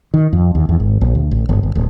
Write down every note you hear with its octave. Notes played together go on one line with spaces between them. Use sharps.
D#3
F2
D#2
E2
G#1
A#1
D2
A1
G1
G1
D1